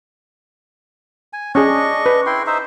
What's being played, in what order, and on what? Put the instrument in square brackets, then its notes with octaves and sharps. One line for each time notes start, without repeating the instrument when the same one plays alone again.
[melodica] G#5
[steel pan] C#4 G#4 [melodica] D4 D#5 C#6
[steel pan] B4
[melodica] E4 G5 C6
D#4 C5 E5